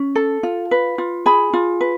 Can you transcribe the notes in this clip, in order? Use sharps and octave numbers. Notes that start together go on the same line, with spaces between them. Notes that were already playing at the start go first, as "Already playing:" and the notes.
Already playing: C#4
A4
F4
B4
F4
G#4 B5
F4
B4